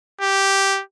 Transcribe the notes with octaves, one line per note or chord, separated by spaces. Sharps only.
G4